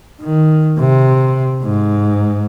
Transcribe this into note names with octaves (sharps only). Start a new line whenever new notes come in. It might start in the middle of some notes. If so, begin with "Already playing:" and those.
D#3
C3
G#2